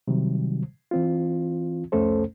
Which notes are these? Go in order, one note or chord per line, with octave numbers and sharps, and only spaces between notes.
C3 D#3 F#3 G3
E3 C4 F4
C2 F2 A3 C#4 A4 C5